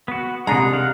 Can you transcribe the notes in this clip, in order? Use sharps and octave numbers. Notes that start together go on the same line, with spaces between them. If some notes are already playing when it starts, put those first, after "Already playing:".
B3 F#4
C2 G#3 D4 D#4 A#5
F5 F#5